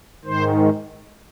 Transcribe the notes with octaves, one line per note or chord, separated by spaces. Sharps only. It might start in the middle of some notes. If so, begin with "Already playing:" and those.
G#2 D#3 C5